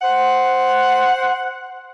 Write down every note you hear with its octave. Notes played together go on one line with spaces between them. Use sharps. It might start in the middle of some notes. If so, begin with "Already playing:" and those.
C5 F#5